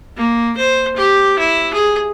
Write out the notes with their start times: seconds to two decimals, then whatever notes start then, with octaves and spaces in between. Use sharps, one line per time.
0.17 A#3
0.57 C5
0.96 G4
1.39 E4
1.74 G#4